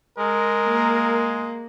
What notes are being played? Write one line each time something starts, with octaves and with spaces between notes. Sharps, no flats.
G#3 A#4
A#3